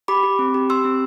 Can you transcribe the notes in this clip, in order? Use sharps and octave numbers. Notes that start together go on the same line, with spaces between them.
G4 B5 D6
G4
C4
G4
G4 C6 E6
C4